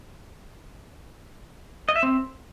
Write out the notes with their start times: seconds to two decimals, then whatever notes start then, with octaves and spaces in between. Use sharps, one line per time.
1.89 D#5
1.96 E5
2.03 C4